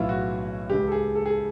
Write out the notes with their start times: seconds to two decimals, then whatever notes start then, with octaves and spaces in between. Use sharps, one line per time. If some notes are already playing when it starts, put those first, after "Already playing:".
Already playing: B1 A2 E3 E4 F4
0.09 F#4
0.69 C#2 C#3 E3 G#3 G4
0.88 A4
0.92 G#4
1.15 A4
1.26 G#4
1.30 A4